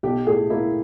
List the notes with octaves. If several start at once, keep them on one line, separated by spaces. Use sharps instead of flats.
B1 G4
A2 G#4
A#3 E4